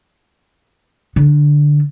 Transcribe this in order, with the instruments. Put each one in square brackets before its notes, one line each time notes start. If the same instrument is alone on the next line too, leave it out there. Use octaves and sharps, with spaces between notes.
[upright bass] D3